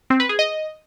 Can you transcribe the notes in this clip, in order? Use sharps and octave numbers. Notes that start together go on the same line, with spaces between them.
C4
B4
G#4
D#5